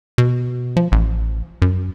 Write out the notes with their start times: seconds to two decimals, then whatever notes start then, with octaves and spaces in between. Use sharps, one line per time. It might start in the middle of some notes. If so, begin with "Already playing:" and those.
0.18 B2
0.77 F3
0.92 A1
1.62 F#2